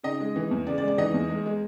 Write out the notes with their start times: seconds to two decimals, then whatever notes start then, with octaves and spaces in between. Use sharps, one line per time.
0.04 C#3 D#4 D#5
0.20 G#3
0.36 E3
0.51 E2
0.67 C#3 D5
0.78 D5
0.82 G#3
0.88 D5
0.98 E3 D#4 D#5
1.14 E2
1.30 G#3
1.46 G#3